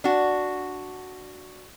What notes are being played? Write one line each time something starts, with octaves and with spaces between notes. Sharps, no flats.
D4 F#4